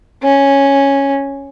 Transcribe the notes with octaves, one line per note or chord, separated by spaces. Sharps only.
C#4